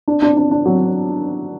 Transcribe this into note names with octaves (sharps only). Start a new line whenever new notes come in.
D4
D4
D4
D4
F#3